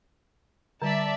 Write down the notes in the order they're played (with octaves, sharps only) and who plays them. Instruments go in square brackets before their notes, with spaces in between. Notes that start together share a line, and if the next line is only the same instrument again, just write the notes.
[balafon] D3 G3 [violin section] D5 E5 A5